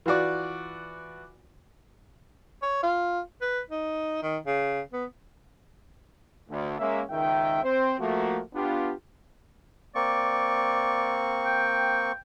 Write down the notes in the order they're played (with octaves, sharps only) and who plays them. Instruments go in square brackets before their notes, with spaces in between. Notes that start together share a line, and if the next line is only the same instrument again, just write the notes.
[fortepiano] E3 F4 F#4 D5
[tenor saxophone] C#5
F4
B4
D#4
D#3
C#3
B3
[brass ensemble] D2
G#3 A#3 C#4 E5
C#2 D#3 E5 G5
C4 C5
F3 A3 A#3 F#4
B3 D4 F4 G4
[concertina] A#3 C4 C#6 [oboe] D5
[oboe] G5